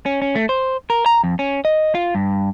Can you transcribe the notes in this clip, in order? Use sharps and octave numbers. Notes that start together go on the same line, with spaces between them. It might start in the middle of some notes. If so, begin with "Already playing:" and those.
C#4
C#4
A3
C5
A#4
A#5
F2
C#4
D#5
F4
G2